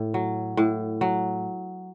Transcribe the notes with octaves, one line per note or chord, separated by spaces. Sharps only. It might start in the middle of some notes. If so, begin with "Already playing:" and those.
Already playing: A2
F#3
A2
F#3